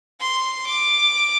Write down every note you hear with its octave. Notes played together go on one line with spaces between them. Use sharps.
C6
D6